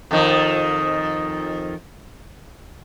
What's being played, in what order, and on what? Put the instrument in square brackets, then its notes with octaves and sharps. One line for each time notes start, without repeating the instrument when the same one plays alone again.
[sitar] F2 D#3